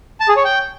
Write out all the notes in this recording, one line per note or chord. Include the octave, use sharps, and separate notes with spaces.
A5
G#4
C#5
G5